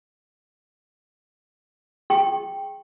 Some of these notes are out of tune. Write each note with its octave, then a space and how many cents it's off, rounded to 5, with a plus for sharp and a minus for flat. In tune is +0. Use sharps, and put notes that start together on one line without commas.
G#4 +0 G5 +0 C#6 -35